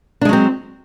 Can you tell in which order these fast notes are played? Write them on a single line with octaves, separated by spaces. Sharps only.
D4 G#3 F#3 C4